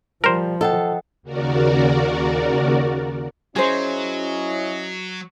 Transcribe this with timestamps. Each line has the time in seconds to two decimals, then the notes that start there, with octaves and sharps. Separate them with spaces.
0.24 F3 G3 A#4 C5
0.61 A4 D#5 F#5 G5
1.23 D#2 C#3 F#4 A#4 D5
3.56 F#3 C#4 E4 G#4 C5 D#5